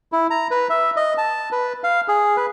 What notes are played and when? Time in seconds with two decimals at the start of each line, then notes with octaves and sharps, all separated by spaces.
0.12 E4
0.30 A#5
0.51 B4
0.70 E5
0.96 D#5
1.18 A5
1.52 B4
1.84 F5
2.08 G#4
2.37 B4